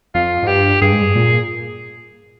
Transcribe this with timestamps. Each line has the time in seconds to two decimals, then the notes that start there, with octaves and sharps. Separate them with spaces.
0.15 F2 F4
0.43 G#2
0.48 G2 G4
0.82 G2 G#4
0.92 G#2
1.02 G2
1.16 A#2